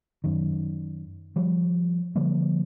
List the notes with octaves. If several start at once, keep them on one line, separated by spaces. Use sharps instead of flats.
F#2 D#3
F3 G3
D3 F3 G3 A#3